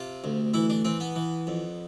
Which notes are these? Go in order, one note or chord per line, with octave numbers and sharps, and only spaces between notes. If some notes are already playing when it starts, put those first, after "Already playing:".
Already playing: C3 F4
D2
E3 E4
D4
E3 C4
B3
E3
F2